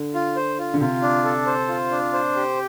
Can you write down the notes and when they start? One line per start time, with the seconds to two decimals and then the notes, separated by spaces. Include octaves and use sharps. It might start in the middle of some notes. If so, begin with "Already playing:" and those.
Already playing: D3
0.14 F4
0.36 C5
0.59 F4
0.74 D3
0.80 C3 F4
1.02 D4
1.24 A4
1.46 C5
1.68 F4
1.91 D4
2.13 C5
2.36 G4